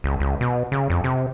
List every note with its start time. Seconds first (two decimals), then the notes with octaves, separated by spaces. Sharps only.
0.04 C#2
0.20 C#2
0.41 B2
0.72 C#3
0.90 F2
1.04 C3